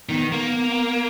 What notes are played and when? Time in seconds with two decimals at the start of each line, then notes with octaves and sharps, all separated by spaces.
0.09 D#3 B3
0.32 A#3